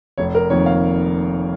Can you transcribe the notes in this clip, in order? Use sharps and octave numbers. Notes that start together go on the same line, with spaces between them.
F1 C#5
A#4
F2 D#3 A#3 C#5
F5